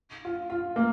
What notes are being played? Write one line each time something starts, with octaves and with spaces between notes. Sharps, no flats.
F4
F4
A#3